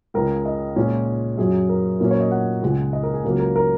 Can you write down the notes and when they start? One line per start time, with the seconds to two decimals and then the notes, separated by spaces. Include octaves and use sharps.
0.14 C#2 C#3 G#3 A#4
0.46 D#5
0.76 A#2 G#3 C#4
1.38 F#2 F#3 C#4 G#4
1.69 A#4
2.00 A#2 F#3 A#3 C#4 A#4
2.11 C#5
2.21 D#5
2.31 F#5
2.62 C#2 C#3 G#3
2.93 D#5
3.03 A#4
3.14 G#4
3.24 C#2 C#3 F#3 A#3 A#4
3.39 A#4
3.56 A#4